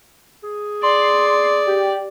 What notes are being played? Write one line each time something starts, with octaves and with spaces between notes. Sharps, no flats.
G#4
D5 C6
G4